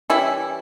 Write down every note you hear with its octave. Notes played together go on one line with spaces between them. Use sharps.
E3 G3 C#4 E4